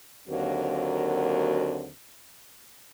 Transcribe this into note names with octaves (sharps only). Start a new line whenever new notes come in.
D#2 D3 F#3 A#3 C4 F#4